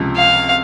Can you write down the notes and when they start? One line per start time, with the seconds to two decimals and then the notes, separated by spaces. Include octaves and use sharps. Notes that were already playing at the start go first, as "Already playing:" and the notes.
Already playing: C#2 C3 F3
0.16 F5